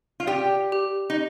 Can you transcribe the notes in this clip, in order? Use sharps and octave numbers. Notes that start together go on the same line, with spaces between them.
F4
G4 D5
G4
D#4